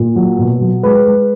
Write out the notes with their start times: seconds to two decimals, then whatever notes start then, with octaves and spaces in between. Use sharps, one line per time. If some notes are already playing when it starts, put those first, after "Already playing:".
Already playing: A#2
0.16 F#3
0.38 B2
0.61 F#3
0.83 G#3 B4 B5
1.06 G#3